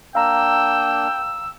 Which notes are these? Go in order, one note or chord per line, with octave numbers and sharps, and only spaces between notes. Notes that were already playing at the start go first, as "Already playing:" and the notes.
A#3 D4 F5 G5 A#5 E6